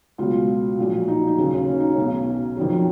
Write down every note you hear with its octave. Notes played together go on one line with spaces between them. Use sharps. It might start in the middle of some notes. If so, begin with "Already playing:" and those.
C#2 B2 F#3 F4
A#1 A#2 F#3
D#4
D#4
D#2 C#3 F#3 C#4
C#4
D#4
C#4
B1 B2 F#3
F2 D#3 F#3